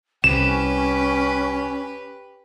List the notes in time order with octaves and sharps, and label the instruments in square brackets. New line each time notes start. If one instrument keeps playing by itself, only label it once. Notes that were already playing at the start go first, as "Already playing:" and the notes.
[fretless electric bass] C2 [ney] C#4 [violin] G4 B4 [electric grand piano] E7